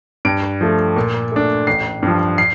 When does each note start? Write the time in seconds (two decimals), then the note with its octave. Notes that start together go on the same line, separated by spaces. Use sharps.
0.25 G2 D7
0.61 F3 A3
0.96 A#2
1.32 A3 D4
1.67 A1 C7
2.03 G2 F3
2.38 C7